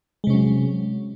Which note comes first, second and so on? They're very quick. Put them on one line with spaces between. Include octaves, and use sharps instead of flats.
G#3 C3 C#4 F#3